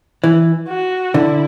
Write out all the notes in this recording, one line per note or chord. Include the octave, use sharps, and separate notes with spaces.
E3
F#4
D3 E4